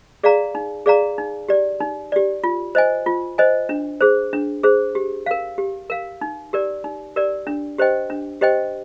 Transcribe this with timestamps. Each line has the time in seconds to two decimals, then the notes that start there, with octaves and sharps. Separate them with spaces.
0.23 G#4 D5 F5 A#5
0.55 D#4
0.86 G#4 D5 F5 A#5
1.18 D#4
1.49 G4 D5
1.80 D#4
2.12 G4 D5
2.44 F4
2.75 C5 D#5 G#5
3.06 F4
3.38 C5 D#5 G#5
3.69 D4
4.01 G#4 C5
4.33 D4
4.63 G#4 C5
4.95 G4
5.26 A#4 F5
5.58 G4
5.90 A#4 F5
6.21 D#4
6.53 G4 A#4 D5
6.84 D#4
7.16 G4 A#4 D5
7.47 D4
7.78 G4 C5 D#5 G5
8.10 D4
8.41 G4 C5 D#5 G5